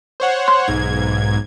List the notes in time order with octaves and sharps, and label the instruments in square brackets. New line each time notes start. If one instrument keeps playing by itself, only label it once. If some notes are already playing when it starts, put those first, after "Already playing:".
[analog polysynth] C5 C#5 F#5
[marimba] C6
[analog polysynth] B1 G#2 G#6